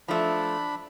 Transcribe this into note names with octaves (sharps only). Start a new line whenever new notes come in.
F3 A3 D4 B5